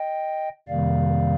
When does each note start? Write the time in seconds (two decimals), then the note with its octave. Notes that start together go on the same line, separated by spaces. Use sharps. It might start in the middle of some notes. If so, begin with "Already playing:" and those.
Already playing: D#5 G5
0.68 F2 C3 D#3 G3 A#3 D5 F5